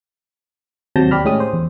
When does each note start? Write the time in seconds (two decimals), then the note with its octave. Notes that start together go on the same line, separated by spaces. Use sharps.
0.96 D#2 C3 F#3 A5 G6 A#6
1.11 D#2 G4 D5 B5 F6
1.25 A2 G#3 C#4 G4 D#6
1.40 C5
1.53 E2